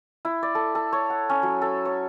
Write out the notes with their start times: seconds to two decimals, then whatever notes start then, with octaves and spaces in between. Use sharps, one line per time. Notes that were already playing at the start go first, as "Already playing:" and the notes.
0.25 E4
0.43 D5
0.55 A4
0.75 A4
0.92 C#5
1.10 F#5
1.29 C#4
1.43 F#3
1.62 A4
1.85 C#5